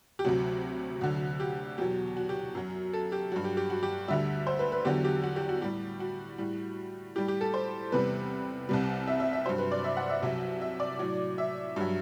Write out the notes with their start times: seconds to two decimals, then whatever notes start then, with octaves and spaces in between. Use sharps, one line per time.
0.19 G4
0.24 D2 C3 F#3 F#4
1.01 D2 D3 F#3
1.40 G4
1.78 E2 B2 F#3 G4
2.16 F#4
2.29 G4
2.55 F#2 F#3
2.93 A4
3.12 G4
3.32 G2 F#3 F#4
3.44 G4
3.57 G4
3.70 F#4
3.83 G4
4.08 D2 D3 G3 E5
4.47 C5
4.59 B4
4.72 B4
4.85 E2 D3 F#3 G4
5.04 G4
5.23 F#4
5.36 G4
5.49 F#4
5.61 A2 G3 G4
6.00 F#4
6.38 A2 G3
7.15 A2 G3 G4
7.28 G4
7.41 A4
7.54 C5
7.92 E2 C3 G3 B4
8.69 C2 C3 G3
9.07 E5
9.20 E5
9.33 E5
9.46 G2 F#3 C5
9.58 B4
9.71 D5
9.84 E5
9.97 F#5
10.10 E5
10.22 C2 C3 F#3 E5
10.61 E5
10.80 D5
10.99 A2 F#3
11.38 E5
11.76 G2 F#3